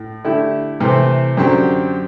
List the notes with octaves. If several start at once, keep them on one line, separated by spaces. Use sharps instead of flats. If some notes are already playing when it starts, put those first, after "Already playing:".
Already playing: A2
D3 A3 E4 G4
C3 E3 A3 C4
F#2 D3 F#3 C4 G4